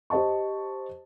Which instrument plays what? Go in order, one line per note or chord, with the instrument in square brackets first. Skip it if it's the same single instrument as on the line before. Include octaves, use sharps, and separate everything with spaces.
[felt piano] G4 C5 D#5 A5 C#6